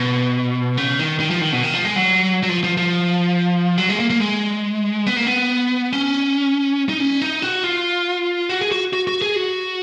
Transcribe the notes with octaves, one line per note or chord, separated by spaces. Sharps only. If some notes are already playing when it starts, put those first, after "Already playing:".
Already playing: B2
C#3
D#3
D#3
F3
D#3
B2
D#3
F3
G#3
F#3
F#3
F3
F3
F3
F#3
G#3
A#3
A#3
G#3
B3
A#3
B3
C#4
D#4
C#4
D#4
F#4
F4
F#4
G#4
F#4
F#4
F#4
G#4
F#4